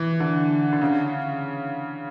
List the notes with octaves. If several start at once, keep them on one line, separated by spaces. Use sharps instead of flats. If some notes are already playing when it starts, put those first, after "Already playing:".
Already playing: E3
D3
D3
C#3